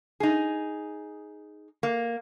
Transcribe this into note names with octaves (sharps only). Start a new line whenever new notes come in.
D#4 G#4
A#3